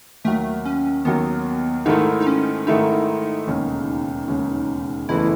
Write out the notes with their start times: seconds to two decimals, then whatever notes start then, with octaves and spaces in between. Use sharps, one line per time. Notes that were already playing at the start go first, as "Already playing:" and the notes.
0.25 D#2 D#3 F#3 A3
0.65 C#4
1.05 D#2 D#3 F#3 B3
1.86 G#2 D#3 A3 D#4 E4
2.20 D#4
2.27 C#4
2.67 G#2 D#3 A3 D#4 E4
3.47 E1 D#2 C#3 G#3 C#4
4.28 E1 D#2 C#3 G#3 C#4
5.09 F#1 E2 C#3 E3 A3 E4